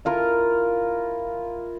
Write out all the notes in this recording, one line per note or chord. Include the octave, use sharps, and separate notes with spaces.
E4 F4 A#4